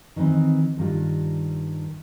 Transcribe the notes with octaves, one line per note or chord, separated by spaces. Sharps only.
D#3 E3 B3 C4 D#4
G2 D#3 F4